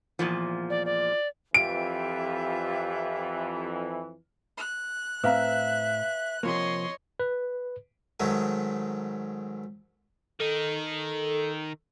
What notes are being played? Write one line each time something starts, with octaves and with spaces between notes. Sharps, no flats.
E2 A#2 F3
D5
D5
F2 E3 F4 G4 E5 D7
F#6
A2 C4 B4 E5 F5 A#5
C3 F3 A#3 C#5 D#5 C6
B4
G#2 D#3 F#3 A3
D#3 D#4 A4